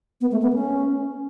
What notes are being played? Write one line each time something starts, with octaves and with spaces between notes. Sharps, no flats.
B3
A3
B3
C#4